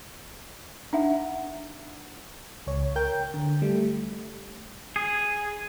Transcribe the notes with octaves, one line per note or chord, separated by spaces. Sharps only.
D4 D#4 E5 F#5
C#2 C#5
A#4 G5 G6
D3
G3 A3
G#4